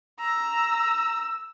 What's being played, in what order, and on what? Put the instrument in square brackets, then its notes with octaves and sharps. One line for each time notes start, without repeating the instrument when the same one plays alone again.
[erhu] A#5 [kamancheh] E6